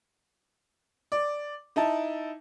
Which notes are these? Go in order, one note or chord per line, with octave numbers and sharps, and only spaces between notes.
D5
D#4 E4 A5